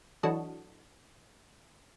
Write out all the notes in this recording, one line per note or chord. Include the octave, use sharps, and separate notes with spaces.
E3 F#3 D4 F#4 A4 D#5